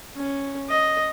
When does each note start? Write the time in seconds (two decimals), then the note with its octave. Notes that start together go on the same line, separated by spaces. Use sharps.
0.16 C#4
0.69 D#5